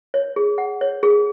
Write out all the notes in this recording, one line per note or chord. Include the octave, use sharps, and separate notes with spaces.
C#5
G#4
F#5
C#5
G#4